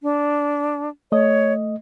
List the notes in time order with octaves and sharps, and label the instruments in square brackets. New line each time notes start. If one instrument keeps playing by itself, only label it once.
[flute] D4
[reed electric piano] A3 D#5 [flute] C#5